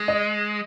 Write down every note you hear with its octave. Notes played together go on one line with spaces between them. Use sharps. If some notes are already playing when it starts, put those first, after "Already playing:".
Already playing: G#3
D#5